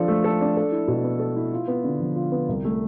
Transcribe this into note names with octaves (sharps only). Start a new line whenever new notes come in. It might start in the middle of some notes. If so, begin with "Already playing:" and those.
Already playing: F3 D4 A4
A3
A4
D4
A4
E4
B2
B3
A4
E4
F4
B3
D3
F3
F4
B3
C2
A3